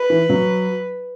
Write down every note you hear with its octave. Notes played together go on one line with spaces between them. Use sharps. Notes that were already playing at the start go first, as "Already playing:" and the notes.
Already playing: B4
E3
F#3